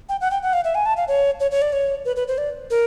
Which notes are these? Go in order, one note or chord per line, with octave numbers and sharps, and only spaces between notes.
G5
F#5
G5
F#5
F5
E5
G#5
A5
F5
C#5
C#5
C#5
D5
C#5
B4
B4
C5
D5
A#4